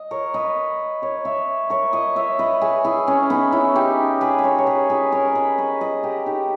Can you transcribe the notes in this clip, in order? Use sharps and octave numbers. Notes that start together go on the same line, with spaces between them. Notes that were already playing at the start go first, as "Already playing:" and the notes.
Already playing: D#5
A#4 C#5
B4 D#5
A#4 C#5
C#5 E5
A#4 C#5
B4 D#5
C#5 E5
B4 D#5
G#4 B4
E4 G#4
C#4
B3 D#4
C#4 E4
D#4 G4
G#4 B4
B4
A#4 C#5
C#5
G#4 B4
G#4 B4
A#4 C#5
B4 D#5
B4 D#5
B4 D#5
G4 A#4
D#4 G4